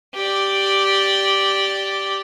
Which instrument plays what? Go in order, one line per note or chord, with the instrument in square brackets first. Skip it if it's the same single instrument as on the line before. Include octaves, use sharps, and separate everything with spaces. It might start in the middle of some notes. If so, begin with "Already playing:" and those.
[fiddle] G4 D5